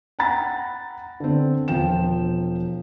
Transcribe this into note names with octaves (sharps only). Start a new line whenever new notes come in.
F#5 G5 A#5 B5 A6 A#6
D3 C4
E1 F3 G5 E7